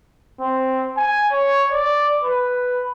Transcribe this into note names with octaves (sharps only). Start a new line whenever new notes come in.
C4
G#5
C#5
D5
B4